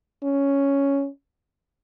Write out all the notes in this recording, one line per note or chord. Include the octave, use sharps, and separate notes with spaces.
C#4